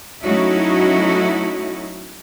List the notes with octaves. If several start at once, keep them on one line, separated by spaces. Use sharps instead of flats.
F#3 A3 C#4 D#4 E4 F#4